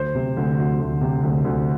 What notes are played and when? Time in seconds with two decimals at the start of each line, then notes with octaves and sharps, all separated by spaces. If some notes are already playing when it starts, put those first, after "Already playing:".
Already playing: D2 C5
0.15 C3
0.37 D2
0.58 D2
0.80 D2
1.01 C3
1.23 D2
1.45 D2